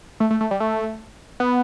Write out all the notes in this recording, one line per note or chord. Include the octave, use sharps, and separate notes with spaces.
A3
A3
A3
G3
A3
B3